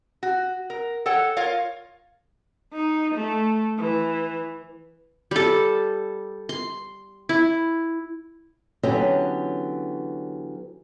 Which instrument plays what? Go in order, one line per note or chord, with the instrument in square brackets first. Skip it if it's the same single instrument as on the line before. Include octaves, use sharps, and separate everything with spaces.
[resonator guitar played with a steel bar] F#4
A#4
A4 C#5 F#5 G5
F4 A#4 C#5 F5
[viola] D#4
A3
E3
[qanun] G3 A4
C6
E4
[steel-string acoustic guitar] D3 E3 F#3 B3 C#4 G4